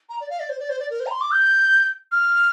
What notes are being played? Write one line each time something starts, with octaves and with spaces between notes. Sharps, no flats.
A#5
D5
F5
D5
C5
D5
C5
D5
A#4
C5
A#5
C6
D6
G6
F6